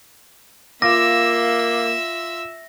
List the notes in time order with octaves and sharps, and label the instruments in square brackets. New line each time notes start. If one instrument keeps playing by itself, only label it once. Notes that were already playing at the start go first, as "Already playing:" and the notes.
[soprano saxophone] A#3 [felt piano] F4 D6 [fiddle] E5 E6 [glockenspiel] A#6